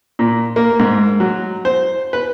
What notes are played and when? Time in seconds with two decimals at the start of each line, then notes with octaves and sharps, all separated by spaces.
0.19 A#2
0.56 A#3
0.80 G#2
1.20 F#3
1.65 C5
2.13 B4